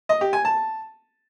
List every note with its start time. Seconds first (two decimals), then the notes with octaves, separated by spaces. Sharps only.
0.09 D#5
0.21 G4
0.33 G#5
0.45 A5